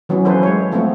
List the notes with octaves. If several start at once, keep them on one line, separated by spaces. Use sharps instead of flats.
E3 F#3 B3 C#4
F3 C#4 E4 A4 B4 C5
G#3 C#5
F3 A3 B3 C4 E4